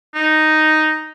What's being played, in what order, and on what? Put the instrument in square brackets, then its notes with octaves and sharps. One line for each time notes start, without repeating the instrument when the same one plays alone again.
[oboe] D#4